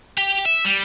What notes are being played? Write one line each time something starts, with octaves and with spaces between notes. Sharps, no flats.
G4
E5
G3